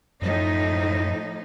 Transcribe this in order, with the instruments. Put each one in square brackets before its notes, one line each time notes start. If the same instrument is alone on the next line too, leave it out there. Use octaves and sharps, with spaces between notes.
[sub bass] F#2 [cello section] A2 F3 D#4